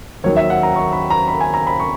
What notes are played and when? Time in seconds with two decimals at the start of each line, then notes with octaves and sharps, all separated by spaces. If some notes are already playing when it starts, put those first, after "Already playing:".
0.24 D#2 D#3 F#3 C#5
0.36 E5
0.50 F#5
0.63 A#5
0.76 C#6
0.93 B5
1.10 A#5
1.28 B5
1.41 G#5
1.54 A#5
1.67 B5
1.80 C#6